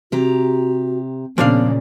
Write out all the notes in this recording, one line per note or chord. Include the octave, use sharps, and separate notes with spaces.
C3 F#4 G4 A#5
A#2 C#3 F3 B3 D4 D5 F5